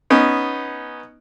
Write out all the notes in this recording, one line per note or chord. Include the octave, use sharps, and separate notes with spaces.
B3 C#4 D#4